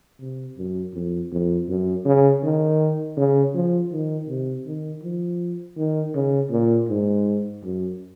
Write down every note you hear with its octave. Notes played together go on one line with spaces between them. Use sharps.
C3
F#2
F2
F2
F#2
C#3
D#3
C#3
F3
D#3
C3
D#3
F3
D#3
C#3
A#2
G#2
F#2